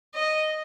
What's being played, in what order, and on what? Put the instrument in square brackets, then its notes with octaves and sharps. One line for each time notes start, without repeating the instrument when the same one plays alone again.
[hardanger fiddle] D#5